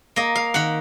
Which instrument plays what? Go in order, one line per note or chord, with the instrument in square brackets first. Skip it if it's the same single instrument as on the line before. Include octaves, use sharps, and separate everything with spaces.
[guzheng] A#3 D#5
F5
D#3 F#5